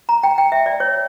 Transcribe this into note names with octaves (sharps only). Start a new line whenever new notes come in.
A#5
G5
G5
E5
D5
C#5